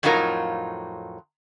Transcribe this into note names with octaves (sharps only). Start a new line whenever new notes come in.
F2 A2 F#3 D#4 F4 A#4